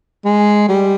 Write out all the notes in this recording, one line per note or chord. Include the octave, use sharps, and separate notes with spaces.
G#3
G3